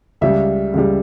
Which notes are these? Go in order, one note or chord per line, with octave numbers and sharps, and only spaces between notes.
C#2 C#3 G3 E5
C#2 C#3 G3